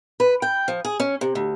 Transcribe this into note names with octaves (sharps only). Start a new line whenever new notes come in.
B4
G5
F3
G#4
C#4
C3
D2